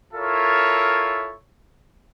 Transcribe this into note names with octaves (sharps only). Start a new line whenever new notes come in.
E4 F4 A4 A#4 C#5 E5